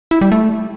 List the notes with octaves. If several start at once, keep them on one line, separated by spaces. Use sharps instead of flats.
E4
G3
A3